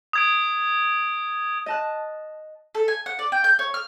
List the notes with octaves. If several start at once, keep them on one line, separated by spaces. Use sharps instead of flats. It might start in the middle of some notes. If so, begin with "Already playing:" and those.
D#6 G#6 D7
D#5 A5 F#6
A4
G#5
F#5
D5
G5
G6
C#5
F6